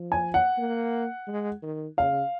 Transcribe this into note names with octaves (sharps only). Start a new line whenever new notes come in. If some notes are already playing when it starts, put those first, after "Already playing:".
Already playing: F3
G#5
F#5
A#3
G#3
D#3
C#3 F5